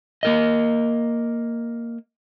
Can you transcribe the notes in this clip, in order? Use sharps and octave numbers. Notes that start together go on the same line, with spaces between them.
A#3 A#4 D#5